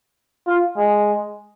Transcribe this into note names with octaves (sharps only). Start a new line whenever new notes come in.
F4
G#3